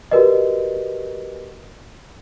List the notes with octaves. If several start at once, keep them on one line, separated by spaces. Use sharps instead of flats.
F#4 G4 A#4 B4 D5 D#5